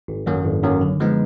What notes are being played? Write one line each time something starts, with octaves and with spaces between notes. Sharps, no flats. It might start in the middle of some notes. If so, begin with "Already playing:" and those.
G#1
F#2 D#3 F#3 A#3
G#1
F#2 D#3 F#3 A#3
D3
F3 G#3 B3 D#4